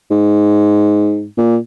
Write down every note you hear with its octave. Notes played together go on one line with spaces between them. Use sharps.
G#2
A#2